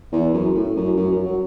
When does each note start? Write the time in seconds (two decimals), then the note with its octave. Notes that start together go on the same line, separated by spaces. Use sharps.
0.12 E2
0.33 F#2
0.55 A2
0.76 F#2
0.97 F#2
1.11 F#2
1.25 F#3